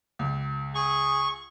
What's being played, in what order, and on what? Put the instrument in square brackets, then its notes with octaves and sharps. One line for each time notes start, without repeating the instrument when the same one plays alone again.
[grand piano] C#2
[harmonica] G#4 [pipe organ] C#6